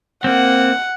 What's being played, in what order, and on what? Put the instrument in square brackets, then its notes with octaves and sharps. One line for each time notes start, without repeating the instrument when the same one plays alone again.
[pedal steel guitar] A#3 C4 [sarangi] F#5